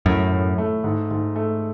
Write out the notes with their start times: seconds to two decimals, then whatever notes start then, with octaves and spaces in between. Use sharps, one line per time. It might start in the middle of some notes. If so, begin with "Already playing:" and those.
0.05 F#2 A2
0.32 A2
0.58 A3
0.84 G#2
1.11 G#2
1.36 A3